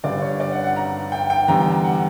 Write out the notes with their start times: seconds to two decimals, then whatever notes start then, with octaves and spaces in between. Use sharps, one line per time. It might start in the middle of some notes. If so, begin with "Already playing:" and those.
0.04 G1 G2 D3 D5
0.22 C#5
0.40 D5
0.52 F#5
0.64 F#5
0.76 A#5
1.12 G5
1.30 G5
1.48 E2 D3 G3 A#5
1.60 G5
1.72 A#5
1.84 F#5